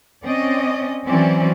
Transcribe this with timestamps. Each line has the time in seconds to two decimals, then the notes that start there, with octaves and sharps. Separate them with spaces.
0.24 C4 C#4 D5 D#5
1.06 E3 F#3 C4 C#4 D5